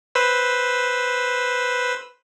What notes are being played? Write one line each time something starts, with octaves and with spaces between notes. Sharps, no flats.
B4 C5 E6